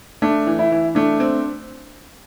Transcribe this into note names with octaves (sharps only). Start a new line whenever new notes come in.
A3 D4
E3
E4
E3
A3 D4
C4